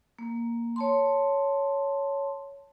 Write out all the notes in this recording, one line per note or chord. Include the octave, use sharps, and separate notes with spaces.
A#3
C#5 A5 C6